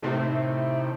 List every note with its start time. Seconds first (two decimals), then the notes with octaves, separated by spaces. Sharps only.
0.02 A2 C3 D#3 A3 C4